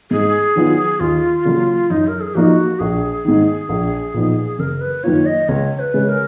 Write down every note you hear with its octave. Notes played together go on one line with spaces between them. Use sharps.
G#2 G#4
D#3 F#3 B3 F4
D#2 F4
C#3 F#3 A#3
F#2 D#4
A#4
G#4
F3 A#3 D#4 F#4
A#1 G#4
G#2 D#3
A#1
A#2 F3 B3 D#4
F#1 A#4
B4
F#2 D#3 A#3 F4 C#5
D#5
C#2 C#5
B4
C#3 G#3 C#4
A#4